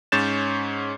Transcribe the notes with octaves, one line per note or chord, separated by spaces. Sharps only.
G#2 C#4 C#5 G6 A6 E7